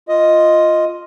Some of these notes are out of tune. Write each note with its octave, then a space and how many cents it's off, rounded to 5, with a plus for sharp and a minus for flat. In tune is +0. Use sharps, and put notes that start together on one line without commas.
F4 +0 D#5 +5